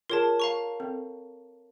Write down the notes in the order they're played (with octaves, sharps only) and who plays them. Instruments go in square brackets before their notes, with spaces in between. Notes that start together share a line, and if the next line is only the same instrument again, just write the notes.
[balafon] F4 G#4 [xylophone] A#4 C#5 A5
[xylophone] F5 A#5 C#6
[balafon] C4 A4